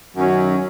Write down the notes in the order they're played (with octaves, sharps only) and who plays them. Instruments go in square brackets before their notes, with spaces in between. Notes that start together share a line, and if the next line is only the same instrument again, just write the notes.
[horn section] F#2 D#3 F#3 C#4